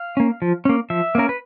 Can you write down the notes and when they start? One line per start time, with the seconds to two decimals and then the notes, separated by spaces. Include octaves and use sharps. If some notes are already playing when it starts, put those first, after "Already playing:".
Already playing: F5
0.17 A#3 C#4
0.42 F3
0.65 A#3 C#4
0.90 F3 E5
1.15 A#3 C#4 A#4
1.29 B4